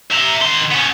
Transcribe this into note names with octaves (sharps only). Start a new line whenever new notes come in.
E5 A#5
D#3 C6
B3 C#4